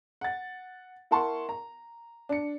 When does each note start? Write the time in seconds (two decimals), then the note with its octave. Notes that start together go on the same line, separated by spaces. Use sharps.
0.21 F#5 A6
1.11 E4 A#4 F#5 A5 C6 C#6
1.49 A#5
2.29 D4 C#7